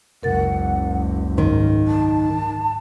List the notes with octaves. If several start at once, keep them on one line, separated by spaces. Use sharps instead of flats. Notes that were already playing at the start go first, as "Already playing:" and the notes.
F#1 C#2 A#4 F#5 A6
G#2 D#3 A#3
A5